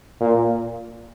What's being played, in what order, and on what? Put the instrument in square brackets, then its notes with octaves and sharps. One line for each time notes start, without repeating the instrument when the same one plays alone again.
[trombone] A#2